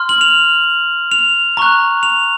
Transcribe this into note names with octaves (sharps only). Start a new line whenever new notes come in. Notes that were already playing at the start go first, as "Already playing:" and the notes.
Already playing: C6 F6
F#7
F7
F7
A#5 C#6 F#6
F7